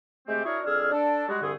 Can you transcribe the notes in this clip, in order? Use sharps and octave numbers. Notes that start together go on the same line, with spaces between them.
C3 G#3 A3 C4 G4
D4 E4 F#4 G#4 A#4 C#5
F2 D4 G#4 E6 F6
D4 A4
G3 G#3 F#4
C2 G2 D3 A3 G#4